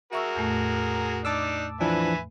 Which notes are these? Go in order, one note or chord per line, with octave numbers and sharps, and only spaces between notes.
F#4 G#4 A#4 E5 C#6 E6
E2 A2 A3
D4 D#4 A5 D6 E6
E3 F3 D4 B4 E5 G#5